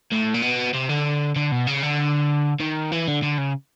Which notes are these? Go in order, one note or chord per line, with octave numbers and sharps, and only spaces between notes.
A2
A#2
B2
C3
D3
D3
B2
C#3
D3
D#3
E3
D3
D3
C#3